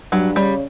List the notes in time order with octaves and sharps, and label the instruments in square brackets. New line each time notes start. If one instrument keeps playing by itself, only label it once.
[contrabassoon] G2 [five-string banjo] F#3
[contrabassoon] C#3 [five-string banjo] G3